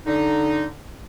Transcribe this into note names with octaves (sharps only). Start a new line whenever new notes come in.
D3 D#4